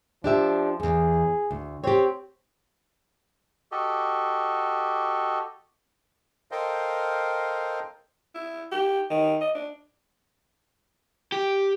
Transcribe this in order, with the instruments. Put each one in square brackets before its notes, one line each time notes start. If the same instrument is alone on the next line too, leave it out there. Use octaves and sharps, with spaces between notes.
[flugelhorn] F3 [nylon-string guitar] D4 G4 E5
[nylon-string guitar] E2 G2 [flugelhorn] G#4
[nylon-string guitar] D2
[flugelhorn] C4 [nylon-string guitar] G4 C#5
[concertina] F#4 G4 A4 D#5
[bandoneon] A4 A#4 C5 D#5 F5 G5
[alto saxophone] E4
G4
D#3
D#5
D4
[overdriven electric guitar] G4